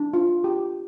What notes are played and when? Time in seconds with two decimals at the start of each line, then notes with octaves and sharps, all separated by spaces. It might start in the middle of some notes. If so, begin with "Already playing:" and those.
Already playing: D4
0.14 F4
0.44 G4